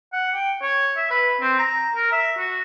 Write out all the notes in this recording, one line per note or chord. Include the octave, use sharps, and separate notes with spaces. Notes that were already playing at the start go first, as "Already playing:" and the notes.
F#5
G5
C#5
E5
B4
C4
A#5
A#4
E5
F#4